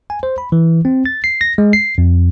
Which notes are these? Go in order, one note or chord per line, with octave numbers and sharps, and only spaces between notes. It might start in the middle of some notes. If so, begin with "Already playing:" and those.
G#5
C5
B5
E3
C4
A6
C7
A#6
G#3
C7
F2